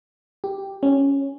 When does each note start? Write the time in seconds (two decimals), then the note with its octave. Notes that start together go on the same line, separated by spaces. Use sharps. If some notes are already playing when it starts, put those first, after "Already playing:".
0.44 G4
0.83 C#4